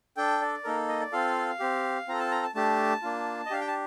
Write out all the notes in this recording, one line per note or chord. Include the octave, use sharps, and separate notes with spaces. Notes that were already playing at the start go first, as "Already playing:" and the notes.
D4 A4 G5
D5
A#3 D#4 A4 A#4
D#5
D5
C4 F4 A4 F5
C4 G4
C4 F4 A4 A#5
A5
A#5
A5
A3 D4 G4 A5
A#3 D4 F4
D#5
D4 G4 F5
G5
A5